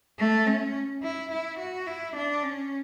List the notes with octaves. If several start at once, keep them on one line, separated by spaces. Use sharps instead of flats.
A3
C#4
E4
E4
F#4
E4
D4
C#4